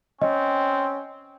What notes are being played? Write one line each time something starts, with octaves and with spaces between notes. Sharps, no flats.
C4 C#4 D#5